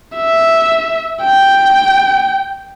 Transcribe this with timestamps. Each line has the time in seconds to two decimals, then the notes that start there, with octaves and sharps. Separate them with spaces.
0.17 E5
1.22 G5